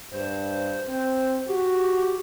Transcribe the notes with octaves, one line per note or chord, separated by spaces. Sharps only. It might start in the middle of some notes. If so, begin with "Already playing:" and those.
G2 C5
C4
F#4 G4